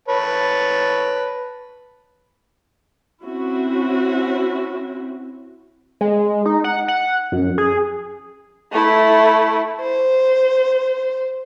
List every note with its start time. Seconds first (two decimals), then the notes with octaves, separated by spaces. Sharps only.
0.08 B4 C#5 A5
3.23 C4 C#4 E4 F#4
6.01 G#3
6.45 D#4
6.64 F#5
6.88 F#5
7.32 F#2
7.58 G#4
8.72 A3 E4
9.80 C5